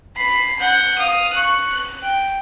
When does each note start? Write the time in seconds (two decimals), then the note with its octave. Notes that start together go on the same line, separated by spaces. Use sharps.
0.16 B5 C7
0.60 F#5 G6
0.98 F5 D#6
1.33 C#6 F#6
1.73 F#6
2.03 G5